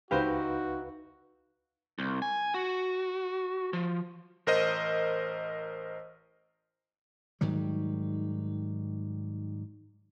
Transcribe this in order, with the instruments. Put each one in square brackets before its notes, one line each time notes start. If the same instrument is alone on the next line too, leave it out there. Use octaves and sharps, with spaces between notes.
[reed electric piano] C#2 B4 F5 [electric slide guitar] D#4 E4 [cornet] F#4 [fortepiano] G4 C5
[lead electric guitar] C2
G#5
F#4
F3
[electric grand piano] A1 A#4 C5 D#5
[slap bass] G#2 D#3 F#3 G3